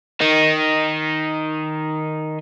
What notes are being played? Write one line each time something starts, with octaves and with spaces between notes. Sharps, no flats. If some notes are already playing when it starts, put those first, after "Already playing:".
D#3 D#4